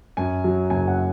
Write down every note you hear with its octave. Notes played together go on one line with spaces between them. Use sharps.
F#2 G#5
F#3
F#1 G#5
F#5